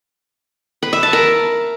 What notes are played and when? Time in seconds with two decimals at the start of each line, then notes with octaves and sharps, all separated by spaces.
0.83 B4
0.93 E5
1.03 A5
1.13 A#4